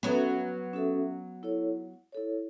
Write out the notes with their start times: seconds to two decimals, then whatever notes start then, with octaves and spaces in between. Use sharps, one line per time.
0.03 F#3 B3 C#4 F#4 A4 E5
0.73 C#4 F#4 A4 E5
1.43 E4 A4 C#5
2.12 E4 A4 C#5